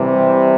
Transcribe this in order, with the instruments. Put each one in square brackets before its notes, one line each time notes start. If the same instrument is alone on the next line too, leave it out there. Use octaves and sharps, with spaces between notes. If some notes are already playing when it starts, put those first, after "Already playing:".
Already playing: [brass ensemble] C3 E3 G3